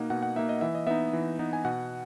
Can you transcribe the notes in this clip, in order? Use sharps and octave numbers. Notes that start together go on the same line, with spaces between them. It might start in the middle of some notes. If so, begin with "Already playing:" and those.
Already playing: B2 A#3 D#4 F#5
B2 F#5
F#5
A#3 D#4 E5
D#5
E3 E5
D#5
B3 D#4 E5
E3
B3 D#4
G#5
B2 F#5